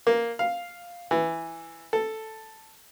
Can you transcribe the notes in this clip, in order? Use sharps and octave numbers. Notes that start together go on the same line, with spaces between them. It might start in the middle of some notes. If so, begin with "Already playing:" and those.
A#3
F5
E3
A4